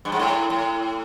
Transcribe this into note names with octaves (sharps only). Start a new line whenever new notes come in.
G2
G#2
A2
A2